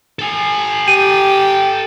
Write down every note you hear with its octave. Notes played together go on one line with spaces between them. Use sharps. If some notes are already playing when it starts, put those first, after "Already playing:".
A4 G#5
G4 G5 D#7